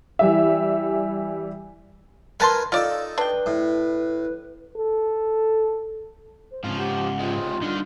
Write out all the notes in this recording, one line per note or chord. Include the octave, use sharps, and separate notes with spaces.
E3 G3 E5
D#3 A#4 B4 G#5 A5 C6
D#4 F4 A4 D5
D4 B4 G5
A2
A4
C5
G#2 C#3 F3 C4 F4
G4 F#5
C3 G#3 F4
D3 G3 D4 D#4 F5